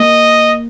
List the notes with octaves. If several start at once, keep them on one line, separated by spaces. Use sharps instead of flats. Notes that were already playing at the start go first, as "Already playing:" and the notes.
Already playing: A#3 D#5